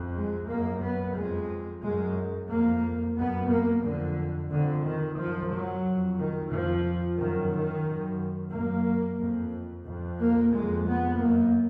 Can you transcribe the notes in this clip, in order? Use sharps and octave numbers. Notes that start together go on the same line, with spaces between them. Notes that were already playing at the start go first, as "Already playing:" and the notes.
Already playing: F2
G#3
F#2 A#3
B3
F2 G#3
F#2 G#3
F2 A#3
F#2 B3
A#3
F2 D3
F2 D3
D#3
F#2 F3
F#3
F2
D#3
F2 F3
F#2 D#3
D#3
F#2
F#2 A#3
F2
F2
A#3
F2 G#3
B3
F#2 A#3